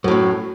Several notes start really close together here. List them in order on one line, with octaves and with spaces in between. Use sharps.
F#2 A2 F#3